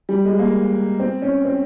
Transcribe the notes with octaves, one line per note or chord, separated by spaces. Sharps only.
G3
G#3
A#3
C4
C#4
C4